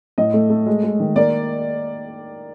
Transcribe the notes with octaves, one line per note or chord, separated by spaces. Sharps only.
A2 D#5
A3
A3
G#3
G#3
D#3
A#3 D5